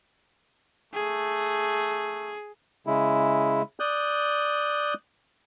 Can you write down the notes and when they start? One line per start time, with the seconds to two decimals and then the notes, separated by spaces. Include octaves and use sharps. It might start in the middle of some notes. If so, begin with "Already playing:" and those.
0.94 A3 G#4
2.87 C#3 G#3 E4
3.80 D5 D#6 F#6 G6